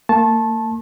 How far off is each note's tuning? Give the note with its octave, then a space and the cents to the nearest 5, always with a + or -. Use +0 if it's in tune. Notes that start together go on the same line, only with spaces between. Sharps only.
A#3 -40 A5 -10 C#6 -45